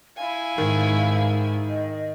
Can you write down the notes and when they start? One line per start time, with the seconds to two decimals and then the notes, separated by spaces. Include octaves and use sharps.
0.17 E4 F5 G#5
0.58 G#2 D#3
1.69 D#5